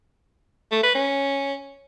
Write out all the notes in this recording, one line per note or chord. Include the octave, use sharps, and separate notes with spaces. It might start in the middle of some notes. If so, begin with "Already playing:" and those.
A3
B4
C#4